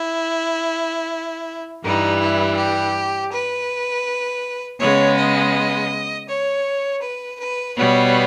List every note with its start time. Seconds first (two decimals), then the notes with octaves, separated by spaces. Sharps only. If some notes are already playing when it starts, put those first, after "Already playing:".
Already playing: E4
1.82 G2 E3 G3 D#4
2.19 E4
2.56 G4
3.31 B4
4.79 C#3 G#3 B3 C#5
5.16 D#5
6.28 C#5
7.02 B4
7.38 B4
7.76 B2 G3 B3 C#5